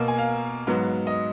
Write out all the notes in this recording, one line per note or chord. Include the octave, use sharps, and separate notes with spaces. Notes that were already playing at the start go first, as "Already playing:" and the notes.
Already playing: B2 A#3
G#5
F5
G#2 F#3 B3
D#5